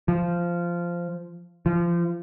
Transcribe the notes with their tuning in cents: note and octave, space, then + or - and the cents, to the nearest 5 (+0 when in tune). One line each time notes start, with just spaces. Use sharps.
F3 -10
F3 -25